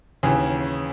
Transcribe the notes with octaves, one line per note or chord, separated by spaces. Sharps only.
D#2 C#3 E3 G#4